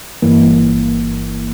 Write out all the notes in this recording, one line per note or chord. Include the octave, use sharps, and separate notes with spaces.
G1 G2 E3 A#3